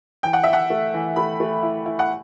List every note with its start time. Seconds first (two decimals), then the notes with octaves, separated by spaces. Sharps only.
0.23 E3 G5
0.33 F#5
0.43 E3 E5
0.53 F#5
0.70 A3
0.94 E3
1.16 A3 B5
1.40 A3
1.63 E4
1.86 E4
1.99 F#5